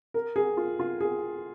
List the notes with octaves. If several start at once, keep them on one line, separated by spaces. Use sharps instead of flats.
A#4
G#4
F4
F4
G#4